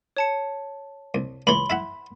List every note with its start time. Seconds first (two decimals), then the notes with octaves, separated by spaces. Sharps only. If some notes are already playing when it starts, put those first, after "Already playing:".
0.17 C#5 A5 C#7
1.14 C2
1.47 C#2 E3 C#5 B5 C6
1.70 E4 E5 F#5